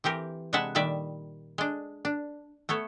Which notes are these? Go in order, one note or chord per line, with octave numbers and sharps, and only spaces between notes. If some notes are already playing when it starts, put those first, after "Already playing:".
E3 C4 G4 A#4
C3 G#3 B4 E5 F#5 A5
A#2 D#3 G3 D5 E5
G#3 D4
D4
A3 B3 A4 C#5